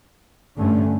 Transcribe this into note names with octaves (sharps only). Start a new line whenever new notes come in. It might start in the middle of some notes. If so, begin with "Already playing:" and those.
G2 D3 A3 C#4